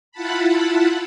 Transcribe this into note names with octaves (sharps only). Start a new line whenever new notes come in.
E4 F4 F#5 A5 B5